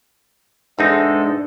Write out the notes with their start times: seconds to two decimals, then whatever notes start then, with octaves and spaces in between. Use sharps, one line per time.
0.79 E2 G#2 G#3 C4 D4 D#4 A4